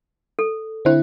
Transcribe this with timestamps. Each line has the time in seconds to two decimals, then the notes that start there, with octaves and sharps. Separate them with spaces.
0.39 A4
0.85 D3 C4 E4 C5